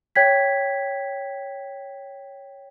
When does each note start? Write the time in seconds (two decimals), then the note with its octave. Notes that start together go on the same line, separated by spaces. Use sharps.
0.16 C#5 G5 G#6 B6